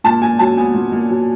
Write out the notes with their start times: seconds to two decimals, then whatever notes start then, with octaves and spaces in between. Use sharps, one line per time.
0.04 A#2 A5
0.22 A#2 G#5
0.39 F#3 A5
0.57 B3 G#5
0.74 A#2
0.92 A#2
1.10 F#3